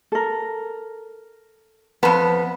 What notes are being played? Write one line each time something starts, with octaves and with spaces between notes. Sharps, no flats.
A4 A#4
F2 B3 A5 B5